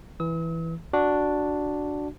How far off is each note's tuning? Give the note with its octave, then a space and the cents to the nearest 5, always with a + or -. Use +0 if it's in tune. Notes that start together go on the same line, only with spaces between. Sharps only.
E3 +0 E6 -45
D4 +0 F#4 +0